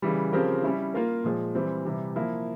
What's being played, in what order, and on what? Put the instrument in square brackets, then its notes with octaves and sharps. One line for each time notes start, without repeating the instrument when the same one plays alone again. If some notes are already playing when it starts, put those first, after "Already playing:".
[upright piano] C#3 E3 G3
C#3 F3 C4 G4 A#4
G3 C#4 E4
A#3 F4 A#4
A#2 F3 G#3
E3 G3 C4
C3 E3 G3
F3 A#3 E4